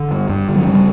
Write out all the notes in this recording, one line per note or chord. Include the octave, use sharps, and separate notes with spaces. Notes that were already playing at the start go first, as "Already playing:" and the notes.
Already playing: D3
G2
G2
D3
F#3
C#3 G3